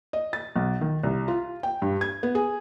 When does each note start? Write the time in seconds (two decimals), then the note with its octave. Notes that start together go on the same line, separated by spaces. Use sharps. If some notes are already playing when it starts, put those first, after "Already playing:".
0.13 D#5
0.33 A6
0.56 B1
0.81 D#3
1.03 C2
1.28 F4
1.63 G5
1.82 G2
2.01 G#6
2.23 B3
2.35 G#4